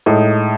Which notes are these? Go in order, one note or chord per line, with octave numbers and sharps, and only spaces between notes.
A2 G#3 D#4